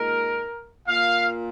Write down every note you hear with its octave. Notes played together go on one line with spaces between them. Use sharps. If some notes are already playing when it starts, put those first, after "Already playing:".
Already playing: A#2 G#3 D#4 A#4
A#2 A#3 F4 F5